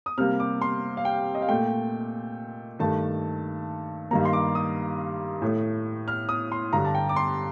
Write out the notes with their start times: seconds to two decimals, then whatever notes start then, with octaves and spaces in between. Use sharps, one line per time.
0.06 D#6
0.18 C3 G3 A#3 F6
0.40 D6
0.61 C6
0.97 F5
1.05 G5
1.35 D#5
1.42 F5
1.48 A#2 A3 G5
2.79 G2 D#3 A3 A5
4.11 G2 D#3 G3 A#3 A#5
4.25 C6
4.33 D6
4.55 D#6
5.42 A2 A3
6.08 F6
6.29 D#6
6.52 C6
6.73 G2 D3 G3 A#5
6.85 A5
6.95 G5
7.09 D6
7.16 C6